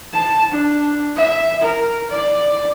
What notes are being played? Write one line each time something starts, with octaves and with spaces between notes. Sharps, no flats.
A5
D4
E5
A#4
D5